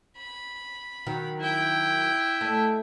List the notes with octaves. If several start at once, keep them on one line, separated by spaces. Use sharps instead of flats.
B5
D#3 F#3
E4 G5
A3 D#5